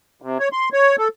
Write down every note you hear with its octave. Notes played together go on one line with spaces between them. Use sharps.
C3
C#5
C6
C#5
A4